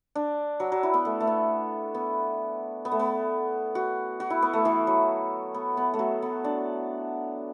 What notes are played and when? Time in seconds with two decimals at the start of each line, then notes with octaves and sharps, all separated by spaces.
0.15 D4
0.60 F#3
0.72 F#3
0.83 E4
0.94 B3
1.05 A3
1.20 A3
1.27 B3
1.94 B3
2.85 B3
2.92 A3
3.00 B3
3.75 F#4
4.20 F#4
4.30 E4
4.42 B3
4.53 A3
4.65 E3
4.87 F#3
5.54 B3
5.77 B3
5.94 A3
5.99 F#3
6.22 B3
6.44 D4